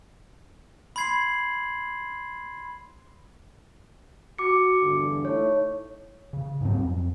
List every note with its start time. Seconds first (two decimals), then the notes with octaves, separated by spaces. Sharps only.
0.96 B5 C6 G#6 C7 F#7
4.39 F#4 D6 C#7
4.81 E2 G2 D3
5.25 A3 D#4 E4 C#5
6.33 C#3
6.61 G#2 F#3 C4
6.77 F2